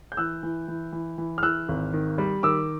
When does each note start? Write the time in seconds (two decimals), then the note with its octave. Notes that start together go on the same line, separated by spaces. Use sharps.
0.12 G6
0.17 E3 E6 F#6
0.43 E3
0.68 E3
0.92 E3
1.18 E3
1.38 F6
1.43 E3 E6 F#6
1.69 G#1
1.93 D#3
2.18 G3
2.43 D#3 D6 E6